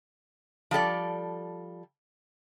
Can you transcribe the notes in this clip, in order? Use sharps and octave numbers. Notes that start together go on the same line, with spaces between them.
F3 G3 A4 D5